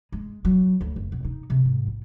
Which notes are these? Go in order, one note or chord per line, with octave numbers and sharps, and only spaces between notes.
G#3
F#3
D2
F#1
B2
D#4
C3
G#2
A#1